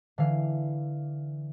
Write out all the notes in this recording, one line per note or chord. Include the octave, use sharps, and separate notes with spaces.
D3 E3 F5